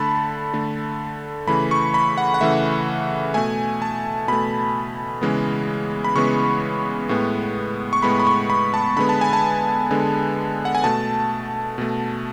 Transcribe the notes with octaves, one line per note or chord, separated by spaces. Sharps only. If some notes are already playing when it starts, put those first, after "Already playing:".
Already playing: D3 A3 A5 B5
D3 A3
C#3 E3 A3 B5
C#6
B5
F#5
F#5
C#3 E3 A3 E5
B2 A3 G#5
A5
B2 A3 B5
C#3 E3 G#3 B3
B5
C#3 E3 G#3 B3 C#6
A2 G#3 B3
C#6
A2 G#3 B3 B5
B5
C#6
B5
A5
D3 G#3 B3 B5
A5
G#5
A5
D3 G#3 B3
F#5
G#5
B2 A3 A5
B2 A3